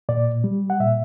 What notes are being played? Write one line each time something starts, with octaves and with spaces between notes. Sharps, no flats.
A#2 D5
G3
F#5
A#2 E5